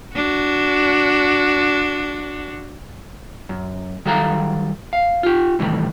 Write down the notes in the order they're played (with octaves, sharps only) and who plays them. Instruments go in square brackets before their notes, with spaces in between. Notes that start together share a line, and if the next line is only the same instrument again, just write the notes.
[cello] D4 F#4
[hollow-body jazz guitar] F#2
D#3 F#3 G3 A4 F5 A#5
F5
F4 G4
A2 C3 D#3 E3 G3 A3